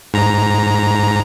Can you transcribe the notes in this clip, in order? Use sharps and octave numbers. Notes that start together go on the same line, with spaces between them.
G#2 A#5